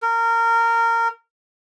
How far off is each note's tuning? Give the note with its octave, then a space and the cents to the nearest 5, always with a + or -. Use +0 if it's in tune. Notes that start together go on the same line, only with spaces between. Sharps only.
A#4 -20